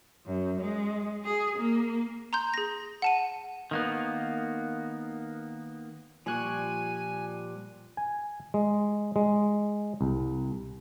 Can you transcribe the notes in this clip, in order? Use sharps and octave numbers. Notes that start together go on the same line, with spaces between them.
F#2
G#3
G#4
A#3
A#5 C6 G6
G#4 A#6
F#5 A5 D#7
D#3 A#3 B3
A#2 F3 G3 G#5 C#6 F#6
G#5
G#3
G#3
C2